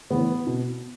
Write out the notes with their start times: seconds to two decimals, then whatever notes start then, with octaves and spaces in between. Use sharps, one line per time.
0.10 A2 E3 B3
0.47 B2